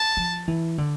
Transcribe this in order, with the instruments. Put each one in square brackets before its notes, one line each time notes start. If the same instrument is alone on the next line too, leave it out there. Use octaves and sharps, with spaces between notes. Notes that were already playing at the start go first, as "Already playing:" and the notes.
Already playing: [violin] A5
[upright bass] F3
E3
D3